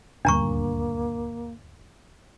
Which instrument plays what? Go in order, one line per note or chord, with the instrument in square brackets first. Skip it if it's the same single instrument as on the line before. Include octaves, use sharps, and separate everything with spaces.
[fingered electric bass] D#1 D2 G2 [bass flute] A#3 [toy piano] D4 A#5 C#6